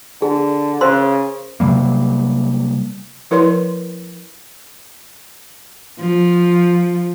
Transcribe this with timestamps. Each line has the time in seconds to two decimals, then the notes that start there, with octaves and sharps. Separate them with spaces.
0.22 D3 G#4
0.81 C#3 A#4 C5 C6
1.60 C3 F#3 G3 A#3
3.31 F3 E4 A#4 B4 C#5 C6
6.00 F3